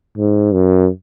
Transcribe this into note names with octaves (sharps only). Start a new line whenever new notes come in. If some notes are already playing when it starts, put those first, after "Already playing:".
G#2
F#2